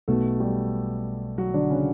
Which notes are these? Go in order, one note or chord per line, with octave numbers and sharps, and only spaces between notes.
B1 B2 A3 A4
G3 G4
F#3 F#4
D3 D4
C#3 C#4